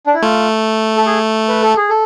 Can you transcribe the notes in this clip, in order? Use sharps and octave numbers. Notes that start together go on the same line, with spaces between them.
D4
E4
A3 F4
A4
G#4
B4
A4
G#4
A4